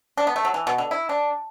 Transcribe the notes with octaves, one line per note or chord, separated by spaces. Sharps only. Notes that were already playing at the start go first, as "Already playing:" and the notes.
D4
B3
A3
F#3
E3
B2
D3
E4
D4